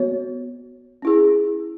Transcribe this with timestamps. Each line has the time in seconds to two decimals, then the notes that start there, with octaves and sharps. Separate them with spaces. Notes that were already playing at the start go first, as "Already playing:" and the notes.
Already playing: B3 F#4 C#5
1.02 C#4 E4 G#4